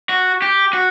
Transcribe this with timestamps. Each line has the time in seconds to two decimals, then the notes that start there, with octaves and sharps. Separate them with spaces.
0.09 F#4
0.42 G4
0.73 F#4